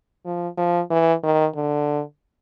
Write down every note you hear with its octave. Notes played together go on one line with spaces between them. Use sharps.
F3
F3
E3
D#3
D3